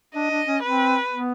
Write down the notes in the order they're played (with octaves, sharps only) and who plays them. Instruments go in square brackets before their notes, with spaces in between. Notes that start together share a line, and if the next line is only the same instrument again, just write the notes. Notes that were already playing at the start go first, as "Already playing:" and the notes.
[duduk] D4 [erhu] D#5
[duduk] D4
C#4
[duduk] C4 [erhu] B4
[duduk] B3